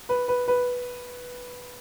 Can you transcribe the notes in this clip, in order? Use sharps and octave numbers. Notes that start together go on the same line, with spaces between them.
B4
B4
B4